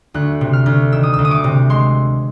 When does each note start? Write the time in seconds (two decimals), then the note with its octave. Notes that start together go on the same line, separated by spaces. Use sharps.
0.14 D2 F#6
0.41 C3
0.53 F6
0.66 D2
0.92 D#3 E6
1.03 D#6
1.13 E6
1.19 D2
1.25 D#6
1.31 D6
1.44 C3
1.70 G#3 C6